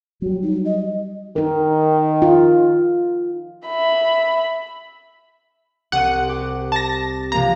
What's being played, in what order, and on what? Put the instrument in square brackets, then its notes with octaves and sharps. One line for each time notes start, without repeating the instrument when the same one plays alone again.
[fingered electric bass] F#3 G3 [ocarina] F#4
[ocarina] D#4
D#5
[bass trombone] D#3 [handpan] D#4 A#4
[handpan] F4
[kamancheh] E5 B5
[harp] C2 C4 D#7 [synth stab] F#5
[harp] G4
[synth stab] A5 A#6
[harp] C3 F3 A#3 [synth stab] A#5